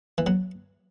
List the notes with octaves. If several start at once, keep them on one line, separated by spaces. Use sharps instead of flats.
E3
F#3